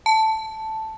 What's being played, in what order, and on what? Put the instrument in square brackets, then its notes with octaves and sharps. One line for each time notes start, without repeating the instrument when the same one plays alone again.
[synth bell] A5